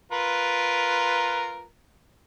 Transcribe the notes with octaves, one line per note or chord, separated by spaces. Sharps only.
F4 A#4 B4